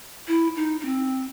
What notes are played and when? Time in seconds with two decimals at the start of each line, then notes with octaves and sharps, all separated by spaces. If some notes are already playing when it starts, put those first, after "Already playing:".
0.28 E4
0.56 D#4
0.81 D#4
0.85 C4